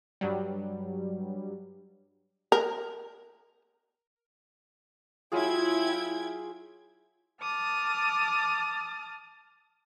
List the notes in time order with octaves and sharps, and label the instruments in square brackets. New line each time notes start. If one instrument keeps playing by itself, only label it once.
[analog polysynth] G2 F#3 G3
[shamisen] A#4
[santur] F#3 F4 G#4 [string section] E4 G5 G#6
[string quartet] A5 D6 D#6 F6